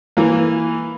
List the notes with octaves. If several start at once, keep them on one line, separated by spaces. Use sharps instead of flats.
E3 A#3